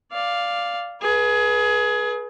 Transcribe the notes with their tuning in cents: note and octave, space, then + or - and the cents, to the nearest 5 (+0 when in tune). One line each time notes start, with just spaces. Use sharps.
D5 +0 F5 +0
G#4 +20 B4 -25